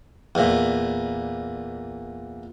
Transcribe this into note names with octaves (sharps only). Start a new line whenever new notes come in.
E2 A#2